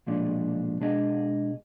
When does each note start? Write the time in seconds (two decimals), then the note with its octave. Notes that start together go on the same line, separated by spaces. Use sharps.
0.07 B1 A#2 F3 G#3 D4
0.80 B2 G#3 D4 G#4 D#5